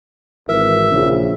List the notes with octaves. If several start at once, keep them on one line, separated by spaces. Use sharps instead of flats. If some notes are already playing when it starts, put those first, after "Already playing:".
G#1 E3 A#4 E5
A#1 C#3